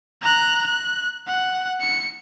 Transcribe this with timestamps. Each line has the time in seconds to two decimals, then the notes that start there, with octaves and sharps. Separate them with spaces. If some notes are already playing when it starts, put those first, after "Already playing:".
0.22 A#5 F#6
0.66 F#6
1.27 F#5
1.81 C#7